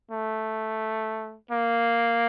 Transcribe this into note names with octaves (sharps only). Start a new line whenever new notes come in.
A3
A#3